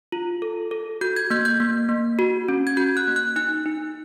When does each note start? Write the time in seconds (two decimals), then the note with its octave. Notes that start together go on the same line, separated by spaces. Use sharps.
0.12 F4
0.42 A4
0.71 A4
1.01 F#4 G6
1.16 G#6
1.30 A#3 G6
1.45 G6
1.60 A#3
1.89 A#3
2.19 F#4
2.48 C#4
2.67 G#6
2.77 F#4 G6
2.97 F#6
3.08 A#3
3.16 F#6
3.36 D#4 F#6
3.66 D#4